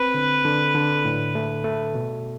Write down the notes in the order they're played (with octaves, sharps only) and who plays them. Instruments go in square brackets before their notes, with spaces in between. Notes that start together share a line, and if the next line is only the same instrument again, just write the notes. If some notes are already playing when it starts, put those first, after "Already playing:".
Already playing: [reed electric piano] C4 [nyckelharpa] B4
[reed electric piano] D3
D3
D3
A2
A3
A3
B2